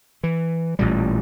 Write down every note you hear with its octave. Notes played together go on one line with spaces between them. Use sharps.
E3
A1 A#2 G3